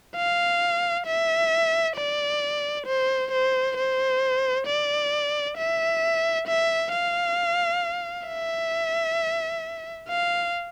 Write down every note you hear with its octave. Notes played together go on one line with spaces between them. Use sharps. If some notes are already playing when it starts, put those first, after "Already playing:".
F5
E5
D5
C5
C5
C5
D5
E5
E5
F5
E5
F5